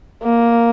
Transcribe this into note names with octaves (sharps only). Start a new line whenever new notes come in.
A#3